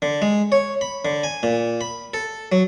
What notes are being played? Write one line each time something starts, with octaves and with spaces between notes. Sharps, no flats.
D3
G#3
C#5
B5
D3
G#5
A#2
B5
A4
F#3